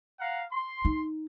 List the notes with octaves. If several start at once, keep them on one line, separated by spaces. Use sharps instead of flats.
F5 F#5 A#5
C6
D#4